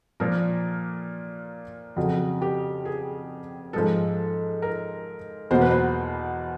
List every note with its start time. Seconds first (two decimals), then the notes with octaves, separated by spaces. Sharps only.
0.20 A#2 F3 A#3 A#4
1.96 F2 C#3 F#3
2.42 G4
2.85 G#4
3.73 G#2 F3 G#3 A4
4.62 A#4
5.51 E2 B2 F#3 A#3 C5
5.61 B4
5.71 C5